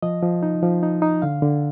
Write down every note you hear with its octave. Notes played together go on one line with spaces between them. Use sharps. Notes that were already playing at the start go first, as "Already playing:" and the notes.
F3 D#5
F3
D#4
F3
D#4
D#4
D3 F5
D3